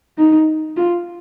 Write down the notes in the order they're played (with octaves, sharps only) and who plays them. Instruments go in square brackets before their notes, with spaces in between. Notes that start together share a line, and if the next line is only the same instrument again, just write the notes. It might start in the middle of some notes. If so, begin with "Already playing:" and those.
[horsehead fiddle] D#4
F4